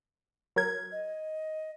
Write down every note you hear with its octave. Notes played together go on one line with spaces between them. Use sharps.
F#3 A#4 G#6
D#5